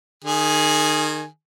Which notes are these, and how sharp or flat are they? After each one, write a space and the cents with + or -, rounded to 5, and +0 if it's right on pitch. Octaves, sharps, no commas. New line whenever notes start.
D#3 -25 G#4 +0 G#5 +0